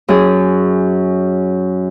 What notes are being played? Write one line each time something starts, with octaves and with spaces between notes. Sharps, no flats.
F#2 G#4